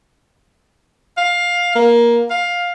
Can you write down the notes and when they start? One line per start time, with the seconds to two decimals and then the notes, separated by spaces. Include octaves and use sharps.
1.18 F5
1.76 A#3
2.30 F5